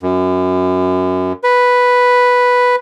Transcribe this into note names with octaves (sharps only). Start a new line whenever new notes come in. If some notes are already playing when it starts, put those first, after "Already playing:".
F#2
B4